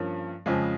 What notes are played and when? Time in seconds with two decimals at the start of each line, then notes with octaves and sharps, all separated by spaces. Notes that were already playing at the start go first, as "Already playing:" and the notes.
Already playing: G2 F3 A#3 C#4
0.46 F2 C#3 F3 G#3